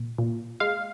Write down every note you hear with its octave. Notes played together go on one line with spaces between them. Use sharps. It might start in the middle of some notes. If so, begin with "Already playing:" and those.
Already playing: A#2
A#2
G#3 F5